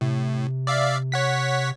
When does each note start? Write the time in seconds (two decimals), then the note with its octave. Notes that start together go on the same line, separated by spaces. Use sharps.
0.01 A2 C3
0.67 D5 E5 F5
1.12 C#5 F#5 B6